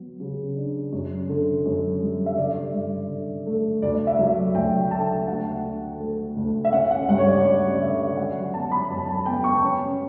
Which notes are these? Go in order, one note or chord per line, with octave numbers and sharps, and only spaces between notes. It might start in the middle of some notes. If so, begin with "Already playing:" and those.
Already playing: F#3 B3
C#3
D4
F#2
D3
F#2
G3
E5
D3 D5
G2
D3
A3
D2 D5
E5
F#3
D2 G5
D3 A5
D2 F#5
D4
A3
D2
E5
C#4 F#5
F#5
G2 F#5
C#5
D5
C#4 D5
D3 E5
F#3 F#5
B3 A5
B5
F#2 A5
A5
B3 G5
C#6
C#4